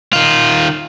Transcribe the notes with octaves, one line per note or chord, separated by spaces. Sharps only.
D#3 F4